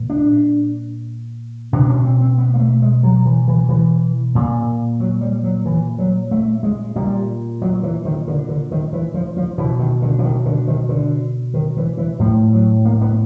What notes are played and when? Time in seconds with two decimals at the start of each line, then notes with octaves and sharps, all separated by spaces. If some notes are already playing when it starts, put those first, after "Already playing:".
Already playing: A#2
0.10 D4
1.73 B2 D4
1.85 C4
1.88 C#4
2.05 C4
2.21 C4
2.38 B3
2.54 A#3
2.60 A3
2.82 G#3
3.03 F#3
3.26 E3
3.48 E3
3.69 E3
4.35 A#2
5.00 F#3
5.21 G3
5.44 F#3
5.66 E3
5.98 F#3
6.31 A3
6.63 G#3
6.96 A#2 G3
7.62 F#3
7.83 E3
8.05 D#3
8.28 D3
8.49 D3
8.71 D#3
8.93 E3
9.14 F3
9.37 F3
9.58 B2 E3
9.79 D#3
10.02 D3
10.19 E3
10.24 D#3
10.45 D3
10.67 D#3
10.89 D3
11.54 D#3
11.77 E3
11.97 E3
12.19 A2 F3
12.53 F#3
12.85 A#3
13.01 B3